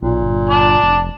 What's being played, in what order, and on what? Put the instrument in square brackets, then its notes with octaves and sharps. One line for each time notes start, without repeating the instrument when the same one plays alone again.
[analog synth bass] B1 [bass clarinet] A#2
[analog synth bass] G1
[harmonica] D5 A5
[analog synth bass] F1